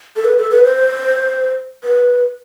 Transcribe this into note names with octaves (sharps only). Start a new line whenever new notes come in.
A4
B4
A4
B4
C5
B4